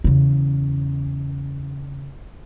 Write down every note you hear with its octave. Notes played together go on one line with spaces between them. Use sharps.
E2 C#3